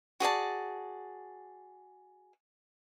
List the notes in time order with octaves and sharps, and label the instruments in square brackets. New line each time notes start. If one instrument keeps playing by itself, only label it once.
[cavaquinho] F#4 G#4 D5 A5